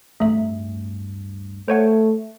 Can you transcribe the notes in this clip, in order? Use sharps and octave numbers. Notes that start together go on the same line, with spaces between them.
D1 G2 A3 E5
A3 C5 C#5 F#5